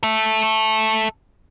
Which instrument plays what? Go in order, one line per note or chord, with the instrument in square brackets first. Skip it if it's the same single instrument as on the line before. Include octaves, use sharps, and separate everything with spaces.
[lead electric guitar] A4 E5